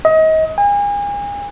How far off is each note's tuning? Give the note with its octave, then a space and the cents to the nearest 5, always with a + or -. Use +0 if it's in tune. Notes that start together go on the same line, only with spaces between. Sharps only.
D#5 +30
G#5 -35